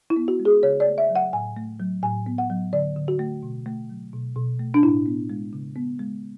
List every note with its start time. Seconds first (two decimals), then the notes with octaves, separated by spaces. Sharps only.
0.10 E4
0.16 B3
0.28 F#4
0.40 G#3
0.45 G#4
0.63 C#3 C#5
0.80 D5
0.86 A3
0.98 E5
1.09 F#3
1.16 F#5
1.33 A2 G#5
1.56 A3
1.80 F#3
2.03 A2 G#5
2.26 B3
2.38 F#5
2.50 F#3
2.73 D3 D5
2.96 D3
3.08 F#4
3.19 A3
3.43 B2
3.66 A3
3.90 F#3
4.13 B2
4.36 B2
4.59 A3
4.74 D4
4.83 A2 E4
5.06 B3
5.30 G#3
5.53 C#3
5.76 B3
5.99 G#3